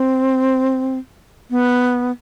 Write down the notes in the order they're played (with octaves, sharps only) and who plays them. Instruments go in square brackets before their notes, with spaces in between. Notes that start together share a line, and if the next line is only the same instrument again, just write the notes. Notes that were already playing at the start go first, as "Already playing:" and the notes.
Already playing: [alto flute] C4
B3